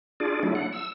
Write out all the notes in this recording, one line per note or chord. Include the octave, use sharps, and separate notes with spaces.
D4 F4 G#4 D5
F#3 A3 D4 E4
F#5
E6